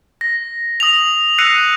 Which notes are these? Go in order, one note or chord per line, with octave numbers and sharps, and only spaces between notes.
A#6
D#6 A#6 F7
E6 F#6 A#6 C7 C#7 D#7